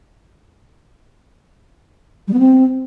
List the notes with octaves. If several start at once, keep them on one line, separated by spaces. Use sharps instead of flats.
G3
B3
C4